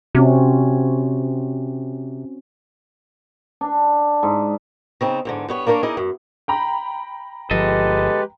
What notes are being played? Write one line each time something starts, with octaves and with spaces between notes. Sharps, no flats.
C3 C4 C#4 F#4
D4
G#2
C#3 C4 D#4
E2 G#2 D3
G2 B3 C#5
A#3 D4 A#4 B4 C#5
D#4 E4 G#4 A#4 D5 D#5
F#2
G5 A#5 B5
G1 F3 G#3 G4 A4 B4 D#5